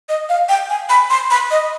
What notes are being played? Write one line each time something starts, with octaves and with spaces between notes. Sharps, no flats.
D#5
F5
G5
G#5
B5
C6
B5
D#5